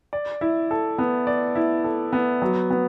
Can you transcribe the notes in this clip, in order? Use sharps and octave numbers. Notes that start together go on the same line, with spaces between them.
D5
E4
A4
B3
D5
E4
A4
B3
F#3
B3